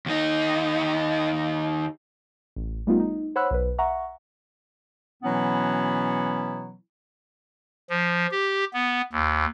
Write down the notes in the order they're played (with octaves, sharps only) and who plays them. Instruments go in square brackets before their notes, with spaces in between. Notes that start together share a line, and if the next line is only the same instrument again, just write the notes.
[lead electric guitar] D#2 D#4
[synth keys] A1
G3 A3 B3 D#4 F4
D#4
C5 C#5 F#5 B5 E6 F#6
B1 B4
E5 F#5 A#5 C#6
[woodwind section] B2 E3 F#3 B3 C#4 E4
[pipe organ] F3
G4
B3
D#2